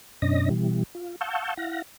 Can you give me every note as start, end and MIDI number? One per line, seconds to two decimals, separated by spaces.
0.22 0.49 42
0.22 0.49 47
0.22 0.49 61
0.22 0.49 62
0.22 0.49 75
0.22 0.49 94
0.50 0.83 47
0.50 0.83 52
0.50 0.83 55
0.95 1.16 65
1.21 1.54 77
1.21 1.54 78
1.21 1.54 81
1.21 1.54 85
1.21 1.54 88
1.21 1.54 91
1.57 1.82 64
1.57 1.82 77
1.57 1.82 78
1.57 1.82 94